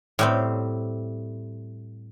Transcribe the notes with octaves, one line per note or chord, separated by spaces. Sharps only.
A2 G3 C4